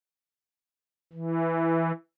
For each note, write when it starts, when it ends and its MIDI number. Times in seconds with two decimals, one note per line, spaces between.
1.13 1.92 52